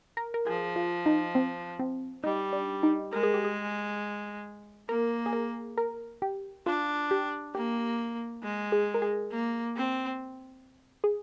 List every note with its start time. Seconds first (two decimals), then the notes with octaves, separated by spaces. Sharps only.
0.17 A#4
0.34 A#4
0.47 F3 G#4
0.76 F4
1.06 D#4
1.35 C4
1.79 C4
2.24 G3 D#4
2.53 D4
2.83 D#4
3.13 G#3 A#4
3.23 G#4
3.34 G4
3.44 G#4
4.89 A#3 A#4
5.26 G#4
5.33 A#4
5.78 A#4
6.22 G4
6.66 D4 F4
7.11 G4
7.55 A#3 G4
8.43 G#3
8.72 G#4
8.94 A#4
9.02 G#4
9.32 A#3
9.76 C4
11.04 G#4